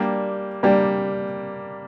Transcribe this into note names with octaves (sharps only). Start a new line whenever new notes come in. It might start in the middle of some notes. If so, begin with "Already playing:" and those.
Already playing: G3 A#3 D4 G4
G3 A#3 D4 G4